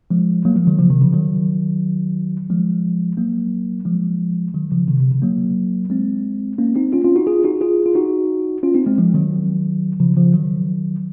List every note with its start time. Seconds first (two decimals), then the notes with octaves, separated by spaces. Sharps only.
0.10 F3 G#3
0.45 F#3 A#3
0.56 F3 G#3
0.67 D#3 F#3
0.78 C#3 F3
0.90 C3 D#3
1.01 C#3 F3
1.13 D#3 F#3
2.50 F3 G#3
3.17 F#3 A#3
3.85 F3 G#3
4.54 D#3 F#3
4.72 C#3 F3
4.88 C3 D#3
5.00 C3
5.11 C#3
5.22 F#3 A#3
5.90 G#3 C4
6.58 A#3 C#4
6.76 C4 D#4
6.93 C#4 F4
7.04 C#4 F4
7.16 D#4 F#4
7.27 F4 G#4
7.44 D#4 F#4
7.61 F4 G#4
7.86 F4
7.95 D#4 F#4
8.63 C#4 F4
8.74 C4 D#4
8.86 G#3 C4
8.98 F3 G#3
9.14 D#3 F#3
10.00 C#3 F3
10.17 C#3 F3
10.34 D#3 F#3